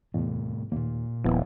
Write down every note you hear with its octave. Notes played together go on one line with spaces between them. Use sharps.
E2 A2 C3 A3
D#2 A#2 A#3
D#1 F3 B3 E4